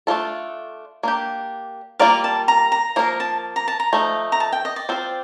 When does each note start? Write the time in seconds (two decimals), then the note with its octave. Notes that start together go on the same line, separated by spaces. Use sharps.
0.07 A3 D4 F4 A4
1.03 A#3 D4 G4
1.99 G3 A#3 F4 A#4 D5 F5
2.24 A5
2.48 A#5
2.72 A#5
2.96 F3 A#3 F4 A#4 A#5
3.20 A5
3.56 A#5
3.68 A5
3.80 A#5
3.93 F3 A3 D#4
4.32 A#5
4.40 A5
4.53 G5
4.65 D#5
4.76 D5
4.89 C4 F4 C5